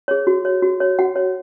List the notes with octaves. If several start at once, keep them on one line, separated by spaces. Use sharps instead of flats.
G#4 C#5
F#4
C#5
F#4
C#5
F#4 F#5
C#5